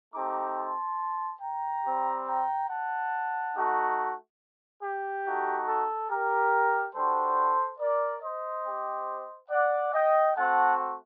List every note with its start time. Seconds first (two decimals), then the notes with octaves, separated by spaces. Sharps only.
0.13 A3 C4 D#4 G4 A#5 D6
0.57 A5 C6
1.41 G5 A#5
1.84 G3 C4 G4
2.27 G5 A#5
2.69 F#5 A5
3.55 A3 D#4 F#4
4.82 G4
5.25 A3 D#4 F#4
5.67 A4
6.09 G4 A#4
6.95 G3 D4 F#4 A4 C5
7.80 A#4 D5
8.22 C5 D#5
8.65 C4 G4
9.50 D5 F#5
9.93 D#5 G5
10.35 A3 C4 F#4 F#5 A5